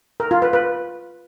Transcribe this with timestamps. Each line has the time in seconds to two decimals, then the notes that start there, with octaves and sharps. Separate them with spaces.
0.20 A#4
0.31 F4
0.42 B4
0.53 B4